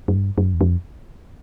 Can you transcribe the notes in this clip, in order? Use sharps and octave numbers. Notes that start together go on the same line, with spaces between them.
F#2
G2
F#2
E2
F2